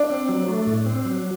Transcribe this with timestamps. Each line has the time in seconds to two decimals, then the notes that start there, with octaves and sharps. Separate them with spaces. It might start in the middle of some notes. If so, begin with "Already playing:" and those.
Already playing: D4
0.10 C4
0.29 F#3
0.48 A3
0.67 A2
0.86 C4
1.05 F#3